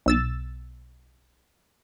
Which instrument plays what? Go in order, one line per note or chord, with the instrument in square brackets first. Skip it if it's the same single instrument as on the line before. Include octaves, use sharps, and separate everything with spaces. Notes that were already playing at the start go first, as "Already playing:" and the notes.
[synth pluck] B1 E6 A6